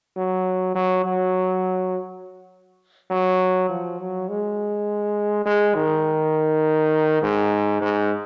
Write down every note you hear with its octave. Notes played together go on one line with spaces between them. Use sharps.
F#3
F#3
F#3
F#3
F3
F#3
G#3
G#3
D#3
G#2
G#2